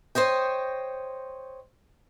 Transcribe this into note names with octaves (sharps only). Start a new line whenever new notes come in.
C5 C#5 D#5 G5